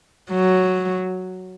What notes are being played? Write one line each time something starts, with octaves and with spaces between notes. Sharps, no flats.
F#3